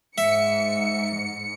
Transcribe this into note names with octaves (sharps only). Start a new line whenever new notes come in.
G#2 E5 C#7